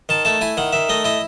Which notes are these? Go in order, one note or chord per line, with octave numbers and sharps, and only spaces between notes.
D#3 A5
A3 A5
E4 G#5
D#3 F#5
D#3 E5
A3 D#5
E4 D#5